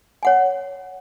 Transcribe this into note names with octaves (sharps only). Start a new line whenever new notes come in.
C#5 F#5 G#5